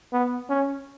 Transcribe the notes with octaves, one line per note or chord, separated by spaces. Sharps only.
B3
C#4